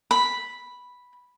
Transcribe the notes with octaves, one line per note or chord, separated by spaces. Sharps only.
B5